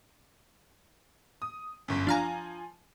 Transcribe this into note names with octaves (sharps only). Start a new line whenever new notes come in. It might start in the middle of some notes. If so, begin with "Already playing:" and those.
D#6
G1 F#2
F3 D4 F5 G#5 A#5